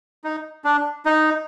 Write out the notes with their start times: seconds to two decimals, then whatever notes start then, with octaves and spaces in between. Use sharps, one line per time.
0.24 D#4
0.64 D4
1.05 D#4